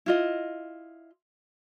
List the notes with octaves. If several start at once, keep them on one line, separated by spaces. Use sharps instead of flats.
E4 F4 D#5